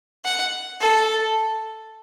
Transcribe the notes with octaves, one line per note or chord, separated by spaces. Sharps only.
F#5
A4